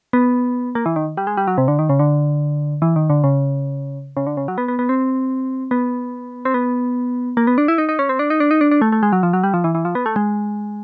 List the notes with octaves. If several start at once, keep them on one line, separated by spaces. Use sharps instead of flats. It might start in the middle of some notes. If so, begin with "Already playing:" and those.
B3
A#3
E3
D#3
G3
G#3
G3
F#3
C3
D3
D#3
C#3
D3
E3
D#3
D3
C#3
C#3
D3
C#3
F#3
B3
B3
B3
C4
B3
C4
B3
A#3
B3
D4
E4
D#4
D#4
C#4
C4
D4
D#4
D4
D#4
D4
D4
A3
A3
G#3
F#3
F3
F#3
G3
F3
E3
E3
F3
B3
A3
G#3